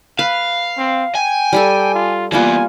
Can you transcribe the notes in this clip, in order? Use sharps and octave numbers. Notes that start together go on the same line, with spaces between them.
B4 F5
C4
G5 G#5
G3 G4 A4
F4
E3 G3 A#3 B3 F4 G#5